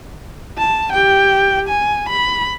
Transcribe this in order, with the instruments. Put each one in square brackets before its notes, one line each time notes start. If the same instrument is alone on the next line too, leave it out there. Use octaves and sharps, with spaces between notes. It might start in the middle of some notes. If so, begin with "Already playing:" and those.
[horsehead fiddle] A5
G4 G5
G#5
B5